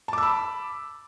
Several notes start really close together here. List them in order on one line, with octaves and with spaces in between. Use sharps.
A5 D6 E6 B5